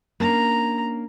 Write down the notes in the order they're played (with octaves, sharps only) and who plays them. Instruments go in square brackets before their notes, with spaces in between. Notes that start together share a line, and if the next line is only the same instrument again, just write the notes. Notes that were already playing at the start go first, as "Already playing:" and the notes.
[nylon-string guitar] A#3 C#4 D4 [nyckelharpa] A#5